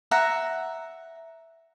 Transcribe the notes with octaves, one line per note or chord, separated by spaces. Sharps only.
E5 F#5 A#5